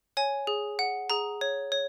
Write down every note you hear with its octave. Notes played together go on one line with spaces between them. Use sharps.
C#5 G#5
G#4
F#5
G#4 A#5
C#5
C#5